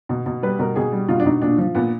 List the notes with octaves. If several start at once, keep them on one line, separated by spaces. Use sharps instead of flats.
B2
B2
G3 B4
B2 A#4
B2 G#4
G3
B2 F4
D4
B2 D#4
A#2 D4
F3
A#2 B3